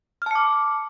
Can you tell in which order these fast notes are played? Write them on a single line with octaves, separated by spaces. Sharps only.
F6 A5 C#7 D6